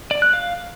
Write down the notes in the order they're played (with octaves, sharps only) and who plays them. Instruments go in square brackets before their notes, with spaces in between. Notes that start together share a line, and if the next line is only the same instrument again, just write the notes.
[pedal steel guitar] D5
F#6
F5